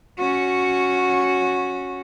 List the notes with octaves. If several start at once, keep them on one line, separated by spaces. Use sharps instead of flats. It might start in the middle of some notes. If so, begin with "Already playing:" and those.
C#4 F#4